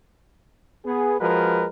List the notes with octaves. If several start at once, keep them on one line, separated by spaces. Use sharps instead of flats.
B3 G#4
F3 G#3 F#4 A#4 B4